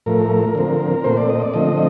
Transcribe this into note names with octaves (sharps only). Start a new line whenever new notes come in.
A2 F3 A3 A#4
D3 F3 C4
A#2 A3 C4 C5
D5
D#5
D5
D3 F3 A3 C4 D#5